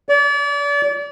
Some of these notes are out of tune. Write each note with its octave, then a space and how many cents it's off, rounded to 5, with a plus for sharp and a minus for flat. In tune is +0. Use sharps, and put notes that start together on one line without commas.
D5 -35